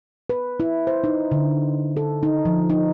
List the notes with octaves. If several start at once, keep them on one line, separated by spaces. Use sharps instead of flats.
B4
E4
C5
D#4
D3
A4
D#4
F3
D#4